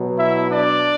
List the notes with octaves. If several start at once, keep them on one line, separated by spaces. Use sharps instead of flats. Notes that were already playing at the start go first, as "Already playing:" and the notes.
Already playing: B2 F#3
E4 E5
D4 D5